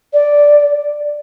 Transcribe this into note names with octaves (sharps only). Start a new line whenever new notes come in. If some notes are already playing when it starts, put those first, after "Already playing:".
D5